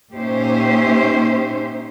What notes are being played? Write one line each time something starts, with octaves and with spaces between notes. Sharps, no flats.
A#2 C#4 D#4 G4 C5 E5